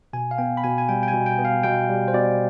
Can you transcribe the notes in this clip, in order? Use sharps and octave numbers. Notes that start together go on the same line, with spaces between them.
B2 G#5
F5
B3 G5
B5
B2 G#5
G#5
G3 G5
G5
G#5
B2
G5
B3
F5
B2 G5
G3
C5
B2 D5